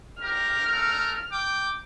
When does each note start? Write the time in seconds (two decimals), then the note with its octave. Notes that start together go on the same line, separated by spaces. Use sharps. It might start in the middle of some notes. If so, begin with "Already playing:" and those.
0.21 G4 A#4 F6
0.67 A3 A#4
1.31 G5 D6